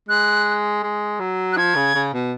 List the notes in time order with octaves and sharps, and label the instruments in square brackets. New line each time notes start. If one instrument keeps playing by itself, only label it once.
[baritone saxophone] G#3 [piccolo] F#6
[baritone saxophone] G#3
F#3
[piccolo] F#6
[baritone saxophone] F3 [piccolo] G#6
[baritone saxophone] C#3
C#3
B2